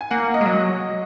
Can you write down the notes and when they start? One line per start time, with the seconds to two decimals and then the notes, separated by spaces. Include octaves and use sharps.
0.01 G#5
0.11 A#3 F#5
0.34 D#5
0.41 G#3
0.46 F#3